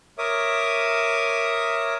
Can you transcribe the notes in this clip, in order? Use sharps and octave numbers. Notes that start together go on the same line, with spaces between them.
A#4 C#5 E5 D6 D#6